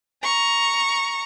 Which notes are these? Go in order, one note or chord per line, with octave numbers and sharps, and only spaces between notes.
A#5 C#6